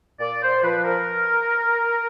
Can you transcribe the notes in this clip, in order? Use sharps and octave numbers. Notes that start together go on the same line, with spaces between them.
A#2 D5
C5
F3 B4
A#4